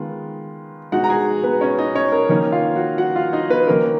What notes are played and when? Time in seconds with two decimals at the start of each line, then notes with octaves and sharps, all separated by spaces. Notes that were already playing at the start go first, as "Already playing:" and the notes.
Already playing: D#3 G#3 B3 F4
0.92 B2 G#3 D#4 F#4 F#5
1.04 A#5
1.09 G#4 G#5
1.43 B3 B4
1.61 C#4 C#5
1.79 D#4 D#5
1.95 C#4 C#5
2.12 A#4
2.29 D#3 A#3 C#4 D#4 C#5
2.52 F4 F5
2.76 F#4 F#5
2.98 F#4 F#5
3.15 F4 F5
3.33 D#4 D#5
3.50 B3 B4
3.67 D#3 A#3 C#4 A#4